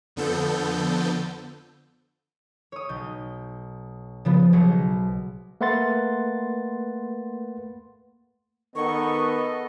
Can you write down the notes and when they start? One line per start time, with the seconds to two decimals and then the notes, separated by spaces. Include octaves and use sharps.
0.16 F2 D3 F3 B3 A4 G6
2.72 C#5 D#6
2.89 B1 G6
4.25 C#3 F3 B3
4.53 B1 F#3 G#4 C5 C#7
5.61 A3 A#3 B4 F#5 C6 A6
8.76 D#3 B3 A4 D#5 C#6